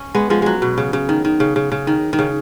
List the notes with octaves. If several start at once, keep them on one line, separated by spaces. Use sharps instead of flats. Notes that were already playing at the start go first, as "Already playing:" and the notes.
Already playing: C#4
G#3 B3
F3 G#3
F#3 G#3
B2
C#3
C#3
D#3
D#3
C#3
C#3
C#3
D#3
D#3
C#3